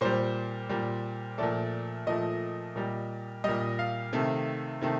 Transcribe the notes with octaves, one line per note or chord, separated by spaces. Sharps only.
A#2 G3 C5
A#2 G3
A#2 F3 A3 D5
A#2 F3 A3 D#5
A#2 G3
A#2 G3 D#5
F5
C3 D#3 A3
C3 D#3 A3